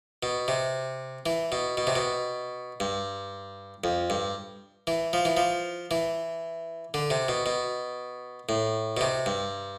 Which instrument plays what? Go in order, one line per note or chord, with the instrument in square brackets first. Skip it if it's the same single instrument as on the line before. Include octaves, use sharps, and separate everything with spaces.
[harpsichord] B2
C3
E3
B2
B2
C3
B2
G2
F2
G2
E3
F3
E3
F3
E3
D3
C3
B2
B2
A2
B2
C3
G2